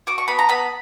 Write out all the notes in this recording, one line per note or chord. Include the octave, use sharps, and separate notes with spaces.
F#4 D6
C#6
B3 B5
A#5
B3 B5